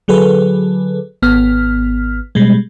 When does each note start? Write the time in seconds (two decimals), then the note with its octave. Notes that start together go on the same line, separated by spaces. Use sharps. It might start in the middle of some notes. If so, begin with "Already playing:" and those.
0.08 D3 F#3 G#4 A4 B4
1.22 G#1 B3 F6
2.35 B2 G3 G#3